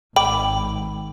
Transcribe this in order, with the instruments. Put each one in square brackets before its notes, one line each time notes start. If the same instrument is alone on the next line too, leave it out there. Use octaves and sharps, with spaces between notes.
[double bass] G#1 [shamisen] G5 [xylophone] B5 D6